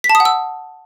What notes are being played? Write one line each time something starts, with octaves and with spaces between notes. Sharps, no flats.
B6
A5
D#6
F#5
E6